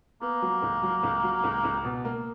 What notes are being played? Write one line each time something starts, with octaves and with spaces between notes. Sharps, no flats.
A#3 B3
F#3
C#2
F#3
C#2
F#3
C#2
C#2
B2
A#3